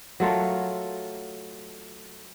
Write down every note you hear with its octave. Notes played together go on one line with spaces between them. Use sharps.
F#3 A3 F4 A#4